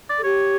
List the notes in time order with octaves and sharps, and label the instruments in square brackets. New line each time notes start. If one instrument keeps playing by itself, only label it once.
[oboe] D5
[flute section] A4
[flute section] G4 [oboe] C#5